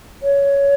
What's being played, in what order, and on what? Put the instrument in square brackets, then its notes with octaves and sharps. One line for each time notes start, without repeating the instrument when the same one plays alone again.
[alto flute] C#5